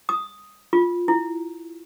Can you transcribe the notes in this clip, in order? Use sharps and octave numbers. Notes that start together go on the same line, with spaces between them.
D#6
F4
E4